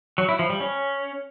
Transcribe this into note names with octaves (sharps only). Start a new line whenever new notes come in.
F#3
E4
F3
G3
C#4